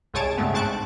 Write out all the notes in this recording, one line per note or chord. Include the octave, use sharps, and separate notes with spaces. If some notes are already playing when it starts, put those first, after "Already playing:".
C2 G#2 G#4 C#5 A5 D7
G2 C#3 G#3 A3 B3
G#2 C4 A5 C#6 F#6 D7